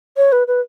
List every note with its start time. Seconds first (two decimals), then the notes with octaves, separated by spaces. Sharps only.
0.17 C#5
0.32 B4
0.47 B4